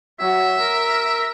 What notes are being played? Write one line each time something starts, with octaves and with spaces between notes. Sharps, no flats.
F#3 E5
A#4